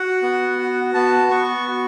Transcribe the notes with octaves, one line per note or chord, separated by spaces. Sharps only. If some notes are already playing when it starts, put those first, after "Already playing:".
Already playing: F#4 F#5
B3
F#4
B3 A5
B3 C#6
F#4